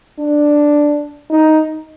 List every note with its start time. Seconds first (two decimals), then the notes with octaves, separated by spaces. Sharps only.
0.19 D4
1.30 D#4